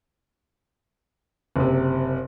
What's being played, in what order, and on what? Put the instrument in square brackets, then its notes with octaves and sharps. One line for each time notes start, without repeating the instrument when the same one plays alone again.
[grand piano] F#1 C3